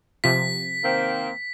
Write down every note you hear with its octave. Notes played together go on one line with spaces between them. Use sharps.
C3 F3 B6
D#3 A#3 C4